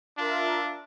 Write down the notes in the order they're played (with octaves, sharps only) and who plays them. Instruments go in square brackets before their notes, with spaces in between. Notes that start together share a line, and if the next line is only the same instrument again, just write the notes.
[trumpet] D4 [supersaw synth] F4 A#4 E5